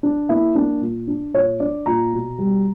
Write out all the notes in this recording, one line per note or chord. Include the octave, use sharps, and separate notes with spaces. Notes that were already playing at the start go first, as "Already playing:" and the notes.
D4
A#3 E4
A#3 D4
A#2
D4
A#2 C#5
D4 D5
A#2 A#5
B2
G3